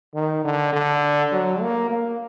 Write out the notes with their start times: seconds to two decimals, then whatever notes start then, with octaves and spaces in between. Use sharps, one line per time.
0.14 D#3
0.44 D3
0.73 D3
1.32 F#3
1.61 A#3
1.90 A#3